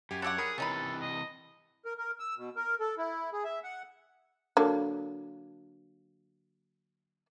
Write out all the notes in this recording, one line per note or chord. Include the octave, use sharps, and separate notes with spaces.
F#2 G4 G#5
D4 G4 C#5 F#5 D6 E6 F#6
G#4 A#4 B5 D#6
C3 E3 C#4 D#4 A4 B4
D#5
A#4
A#4
E6
B2
A#4
A4
E4
G#4
E5
F#5
D3 F#3 A#3